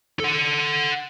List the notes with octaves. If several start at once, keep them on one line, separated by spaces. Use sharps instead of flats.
A4 F#5